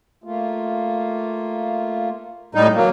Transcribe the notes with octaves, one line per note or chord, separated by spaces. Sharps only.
A3 A#3 F4
A2 G3 G#3 D#4
D3 E3 F#3 A#3